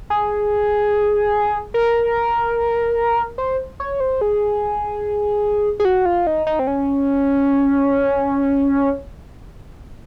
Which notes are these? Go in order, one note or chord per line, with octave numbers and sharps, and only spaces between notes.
G#4
A#4
C5
C#5
C5
G#4
G#4
F#4
F4
D#4
D#4
C4
C#4